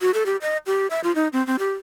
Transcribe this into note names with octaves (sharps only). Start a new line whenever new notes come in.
F#4
A4
G4
D#5
G4
E5
F4
D#4
C4
C4
G4